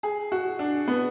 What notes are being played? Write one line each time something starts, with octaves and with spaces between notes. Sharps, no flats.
G#4
F#4
D4
B3